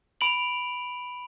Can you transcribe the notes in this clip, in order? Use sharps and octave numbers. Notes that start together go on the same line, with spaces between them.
B5 D7 F7 F#7